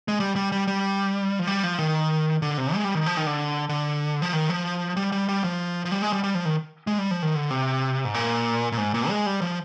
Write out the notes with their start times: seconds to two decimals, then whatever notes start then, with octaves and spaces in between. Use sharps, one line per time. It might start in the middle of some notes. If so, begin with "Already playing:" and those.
0.08 G#3
0.20 G3
0.36 G3
0.52 G3
0.67 G3
1.39 F3
1.47 G3
1.63 F3
1.79 D#3
2.42 D3
2.58 C3
2.74 G#3
2.84 G3
2.95 D#3
3.06 F3
3.17 D#3
3.26 D3
3.69 D3
4.22 F3
4.33 D#3
4.49 F3
4.97 G3
5.12 G3
5.28 G3
5.44 F3
5.85 F3
5.92 G3
6.02 G#3
6.13 G3
6.23 G3
6.35 F3
6.45 D#3
6.87 G#3
6.98 G3
7.11 F3
7.22 D#3
7.36 D3
7.51 C3
8.05 G#2
8.14 A#2
8.72 A#2
8.78 G#2
8.94 A#2
9.09 G#3
9.26 G3
9.42 F3